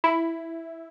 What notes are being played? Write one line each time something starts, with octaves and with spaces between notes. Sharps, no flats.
E4